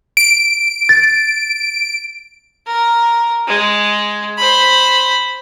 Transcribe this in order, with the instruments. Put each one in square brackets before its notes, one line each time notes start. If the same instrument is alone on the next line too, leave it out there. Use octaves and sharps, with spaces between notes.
[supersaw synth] D7
[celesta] A6
[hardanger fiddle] A#4
G#3
C5 B5